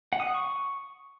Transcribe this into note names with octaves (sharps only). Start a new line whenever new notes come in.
F#5
D#6
F#5
C#6